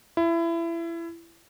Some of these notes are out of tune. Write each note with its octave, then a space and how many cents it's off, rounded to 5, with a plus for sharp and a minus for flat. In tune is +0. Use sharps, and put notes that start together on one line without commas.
E4 +25